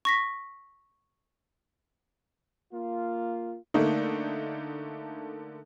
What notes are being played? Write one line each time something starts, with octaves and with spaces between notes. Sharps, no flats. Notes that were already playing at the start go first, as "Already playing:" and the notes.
C#6 A#6 B6
A#3 F4
D3 A3 A#3 D#4